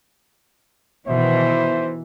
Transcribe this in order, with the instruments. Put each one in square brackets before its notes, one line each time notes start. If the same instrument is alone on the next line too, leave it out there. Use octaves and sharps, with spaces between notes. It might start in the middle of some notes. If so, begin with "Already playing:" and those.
[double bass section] B2 D#3 [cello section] E3 [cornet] C5 [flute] E5